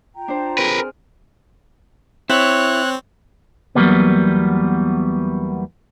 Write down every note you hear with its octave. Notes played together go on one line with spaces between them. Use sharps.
F4 G5 A#5
D4 C5
C4 G#4 A#4 B4
F6
C4 E4 C#5 F#6
E2 F#3 G3 A#3 B3